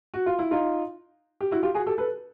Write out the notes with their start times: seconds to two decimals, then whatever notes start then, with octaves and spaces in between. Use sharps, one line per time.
0.14 F#4
0.26 F4
0.39 E4
0.51 D#4 F4
1.41 G4
1.51 E4 F#4
1.63 F4 G4
1.74 F#4 G#4
1.86 G4 A4
1.98 A4 B4